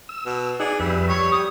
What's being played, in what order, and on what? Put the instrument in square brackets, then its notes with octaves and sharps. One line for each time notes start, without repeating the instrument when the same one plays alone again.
[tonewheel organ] E6
[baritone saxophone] B2
[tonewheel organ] D#4 D5 F#5 [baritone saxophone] G#4
[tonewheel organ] F2 B4 E5 [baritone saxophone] G3
[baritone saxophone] G3 [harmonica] C#5
[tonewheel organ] G4 [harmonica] D#6